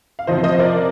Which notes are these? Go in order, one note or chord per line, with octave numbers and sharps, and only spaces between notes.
F5
F2 C3 F3 C5 D#5
C5 D#5
D#5
A#4 D5